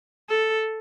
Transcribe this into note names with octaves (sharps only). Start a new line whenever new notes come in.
A4